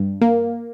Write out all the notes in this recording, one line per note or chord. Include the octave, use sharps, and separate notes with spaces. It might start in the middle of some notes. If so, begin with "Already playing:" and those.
Already playing: G2
A#3